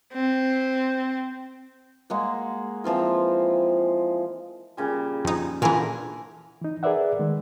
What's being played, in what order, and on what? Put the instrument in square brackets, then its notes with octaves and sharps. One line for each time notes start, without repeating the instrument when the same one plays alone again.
[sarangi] C4
[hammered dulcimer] G#3 A#3 F#5
E3 F3 C4 F4
A#2 C#3 G3
[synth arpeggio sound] F2 D#4
[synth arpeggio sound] A#2 E3 [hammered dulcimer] D3 F3 E5 [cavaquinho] G#4 A#4
[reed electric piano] E3 D#4
G#4 A#4 B4 D5 E5 F#5
D#3 G#3